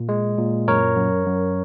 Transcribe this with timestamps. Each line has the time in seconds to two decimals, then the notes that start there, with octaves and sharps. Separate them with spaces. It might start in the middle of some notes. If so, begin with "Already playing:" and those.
Already playing: A#2
0.09 G#3
0.38 A#2
0.68 F#2 A#4 C#5
0.96 F#2
1.26 F#2